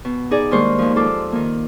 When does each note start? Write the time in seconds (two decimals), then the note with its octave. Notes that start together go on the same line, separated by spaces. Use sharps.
0.05 B2
0.31 D#4 G#4 D5
0.51 G2 D#3 G#3 A#3 C5 C#6
0.78 D#2 F3
0.96 G#2 F3 F4 A4 D6
1.32 D#3 A#3